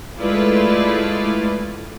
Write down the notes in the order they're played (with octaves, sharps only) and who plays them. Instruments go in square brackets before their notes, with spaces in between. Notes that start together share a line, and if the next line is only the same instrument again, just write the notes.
[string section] G#3 A3 E4 F4 B4 D5